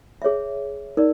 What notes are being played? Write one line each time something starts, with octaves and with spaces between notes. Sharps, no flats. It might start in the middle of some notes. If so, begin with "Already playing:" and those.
G#4 C#5 E5
D#4 A#4 D5